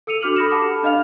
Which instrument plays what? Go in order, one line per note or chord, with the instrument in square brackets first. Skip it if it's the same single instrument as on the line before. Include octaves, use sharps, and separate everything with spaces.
[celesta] A4 E6 C#7 D#7 F7
D4 F#4 D6 F6 F7 F#7
A4 B5 D#6 A#6 C#7 E7
G4 F#5 A5 B5 D6 F6
D4 D#5 F5 F6 F7